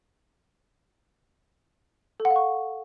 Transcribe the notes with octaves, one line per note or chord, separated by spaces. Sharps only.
A4
F#5
F5
C#6